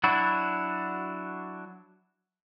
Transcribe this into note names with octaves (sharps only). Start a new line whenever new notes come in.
F#3 D4 E4 F#4